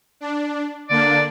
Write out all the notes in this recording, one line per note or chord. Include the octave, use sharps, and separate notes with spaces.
D4
D3 A#3 D4 D5